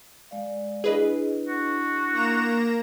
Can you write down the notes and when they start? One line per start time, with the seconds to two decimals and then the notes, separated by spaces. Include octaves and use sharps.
0.31 G#3 D5 F5
0.84 D4 E4 G#4 B4 D#5
1.49 F#4
2.13 A#3 A#5 E7